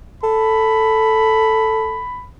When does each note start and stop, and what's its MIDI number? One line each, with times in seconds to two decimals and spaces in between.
0.23 2.01 69
0.23 2.27 83